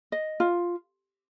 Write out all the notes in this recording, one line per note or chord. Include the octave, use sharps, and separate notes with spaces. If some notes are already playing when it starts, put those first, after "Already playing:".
D#5
F4